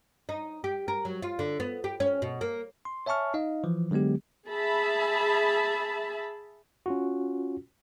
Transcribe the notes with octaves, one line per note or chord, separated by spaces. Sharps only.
D#4
G4
A#4
F#3
F4
D3
B3
G4
C#4
B2
A#3
C6
C#5 E5 G#5 A5 C#6 F6
D#4 D#5 F5
E3 F3
D3 F#3 G#3 B3 G4
G#4 E5 A5 B5
C#4 F4 F#4